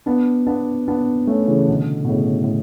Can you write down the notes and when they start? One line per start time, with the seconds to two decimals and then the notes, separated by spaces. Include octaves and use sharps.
0.06 B3 D4
0.46 B3 D4
0.88 B3 D4
1.27 A3 C#4
1.48 C#3 E3
1.68 B2 D3
2.04 B2
2.09 A2 C#3
2.44 A2